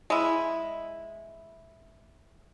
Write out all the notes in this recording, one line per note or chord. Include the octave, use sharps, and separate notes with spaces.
G#3 E4